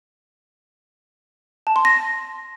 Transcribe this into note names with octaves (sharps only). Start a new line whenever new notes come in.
A5
C6
A#6